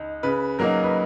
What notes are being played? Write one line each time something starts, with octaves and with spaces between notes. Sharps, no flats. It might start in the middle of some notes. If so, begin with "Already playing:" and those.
Already playing: C#2 D#4
C#3 B4
F#3 A#3 D#4 A#4
B4